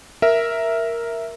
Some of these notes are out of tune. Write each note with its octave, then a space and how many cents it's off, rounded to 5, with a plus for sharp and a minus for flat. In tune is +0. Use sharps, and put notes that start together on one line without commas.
A#4 +0 E5 +0